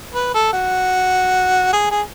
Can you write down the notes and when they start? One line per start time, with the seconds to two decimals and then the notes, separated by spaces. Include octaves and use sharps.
0.14 B4
0.34 A4
0.53 F#4
1.73 G#4
1.91 G#4